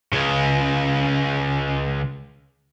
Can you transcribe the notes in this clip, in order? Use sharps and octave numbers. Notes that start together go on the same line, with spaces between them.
C#2 C#3